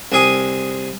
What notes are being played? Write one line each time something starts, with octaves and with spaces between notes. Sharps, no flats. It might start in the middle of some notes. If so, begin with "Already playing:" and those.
C2 G#4 D#6